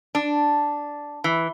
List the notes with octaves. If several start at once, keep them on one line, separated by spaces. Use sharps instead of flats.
D4
E3